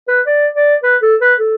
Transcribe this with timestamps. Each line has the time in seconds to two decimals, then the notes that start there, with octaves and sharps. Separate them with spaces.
0.08 B4
0.27 D5
0.55 D5
0.83 B4
1.02 A4
1.21 B4
1.40 A4